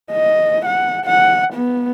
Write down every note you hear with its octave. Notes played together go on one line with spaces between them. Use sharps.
D#5
F#5
F#5
B3